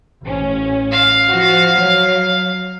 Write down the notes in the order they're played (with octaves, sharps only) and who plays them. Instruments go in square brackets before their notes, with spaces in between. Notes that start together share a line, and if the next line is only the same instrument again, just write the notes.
[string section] A1 C#4
[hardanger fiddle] F5
[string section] F3 F#4
F#3